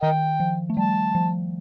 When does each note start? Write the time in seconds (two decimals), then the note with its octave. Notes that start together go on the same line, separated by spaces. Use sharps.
0.02 D#3 A#4 D#5 G5
0.40 F3
0.70 A3
0.76 G3 A5
1.15 F3